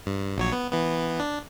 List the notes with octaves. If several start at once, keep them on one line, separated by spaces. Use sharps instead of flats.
G2
A#1 F#3 C#5
B3
E3 B3
D4